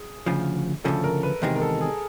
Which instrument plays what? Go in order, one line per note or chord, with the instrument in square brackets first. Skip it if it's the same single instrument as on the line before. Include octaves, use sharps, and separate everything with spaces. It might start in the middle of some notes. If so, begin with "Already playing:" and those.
Already playing: [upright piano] G#4
[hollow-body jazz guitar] D2 C#3 F3
[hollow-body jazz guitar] D2 C#3 F3 [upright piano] A4
[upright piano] A#4
B4
[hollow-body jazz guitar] E2 C3 D#3 G#3 [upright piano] A#4
[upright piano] A#4
A4
G#4